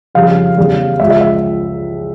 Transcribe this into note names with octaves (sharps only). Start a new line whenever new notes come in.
F2 C#3 G3 F5
E2 C#3 G3
C#2 C#3 F3 E5
E5
E5